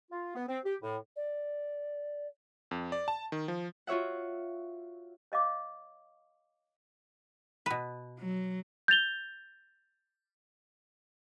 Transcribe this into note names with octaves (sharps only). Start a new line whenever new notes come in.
F4
B3
C4
G4
A2
D5
F2
D5
A5
D#3
F3
F4 F#4 C#5 E5 F#5
C#5 D#5 F5 D6
B2 B4
F#3
G6 A6 F7 G7